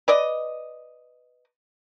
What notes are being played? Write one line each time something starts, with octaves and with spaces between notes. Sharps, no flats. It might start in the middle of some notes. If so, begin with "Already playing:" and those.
B4 D5 D#5